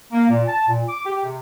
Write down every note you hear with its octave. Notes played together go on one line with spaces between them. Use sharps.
A#3
A#2
A5
A#2
D6
G4
C3